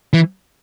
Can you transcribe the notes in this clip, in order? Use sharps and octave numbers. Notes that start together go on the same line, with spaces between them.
E3